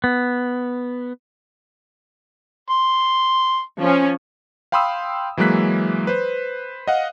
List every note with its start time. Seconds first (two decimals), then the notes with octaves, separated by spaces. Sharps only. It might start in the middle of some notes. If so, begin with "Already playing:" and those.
0.04 B3
2.70 C6
3.81 F3 C#4
4.72 F5 G5 B5 C6 D#6 E6
5.37 E3 F#3 G#3 A#3 F#6 B6
6.07 B4 C5
6.87 D#5 F5 F#5